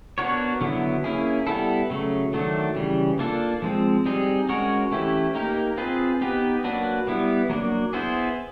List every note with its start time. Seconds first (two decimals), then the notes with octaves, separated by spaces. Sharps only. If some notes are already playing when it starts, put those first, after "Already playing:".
0.18 B3 D4 F#4 A#4 C#5
0.61 D3 F#3 B3 E4
1.04 A#3 C#4 E4 G#4
1.47 G3 B3 E4 A4
1.90 C#3 F#3 A3
2.33 D#3 F#3 A3 D4
2.76 C#3 E3 G3
3.19 A#3 D4 F4 A4
3.62 F3 G#3 C4
4.06 G3 C4 D#4 G#4
4.49 G#3 C#4 F#4 A#4 C#5
4.92 E3 A3 C#4 E4 G4
5.35 A#3 D#4 G4 A#4
5.77 C4 F4 G#4 B4
6.21 B3 D#4 G4 B4
6.64 F#3 A#3 D4 F#4 B4
7.07 G3 B3 E4
7.49 F#3 A#3 D4
7.93 B3 E4 G#4 C5